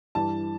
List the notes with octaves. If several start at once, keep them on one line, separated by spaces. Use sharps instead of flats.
G2 E3 A5